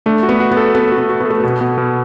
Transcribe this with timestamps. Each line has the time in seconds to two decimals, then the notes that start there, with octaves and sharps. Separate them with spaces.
0.06 A3 D4
0.23 F#4
0.29 B3
0.40 F#4
0.51 B3
0.57 A4
0.75 B3 A4
0.92 F#4
0.98 B3
1.09 F#4
1.20 B3
1.26 A3 A4
1.40 B2 B3
1.61 B2
1.78 B2